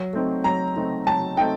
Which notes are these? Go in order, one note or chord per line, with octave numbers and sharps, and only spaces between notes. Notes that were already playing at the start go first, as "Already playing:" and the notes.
Already playing: F#3
A3 C4 D#4
F#3 A#5
A3 C4 D#4
F#3 A5
A3 C4 D#4 G5